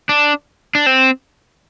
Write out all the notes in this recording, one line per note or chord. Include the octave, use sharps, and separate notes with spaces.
D4
D4
C4